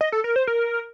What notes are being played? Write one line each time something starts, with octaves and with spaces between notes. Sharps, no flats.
D#5
A4
A#4
C5
A#4